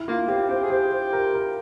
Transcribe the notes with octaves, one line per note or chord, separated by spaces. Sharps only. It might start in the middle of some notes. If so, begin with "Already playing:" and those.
Already playing: E4
A#3 F4
C4 G4
G4 C5
G#4
G4 C5
C5
A#4
A#4